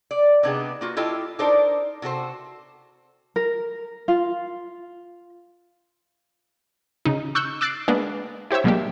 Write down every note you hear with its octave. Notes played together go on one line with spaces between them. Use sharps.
D5
C3 B3 D4 D#4 G4 G#4
A#3 F4 F#4
E4 F4 G4 A4 D#5
D4 D#4 A4 A#4 C5 D5
C3 F#4 A4 C5
A#4
F4
C#3 D#4
C#6 E6 F#6 G6 C#7
D6 E6 F#6 A6 C7 D7
G#3 A#3 B3 D4
E4 G4 C5 C#5 E5
B2 F#3 G#3 A#3 D4 G4